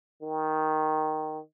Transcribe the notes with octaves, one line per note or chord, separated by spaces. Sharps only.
D#3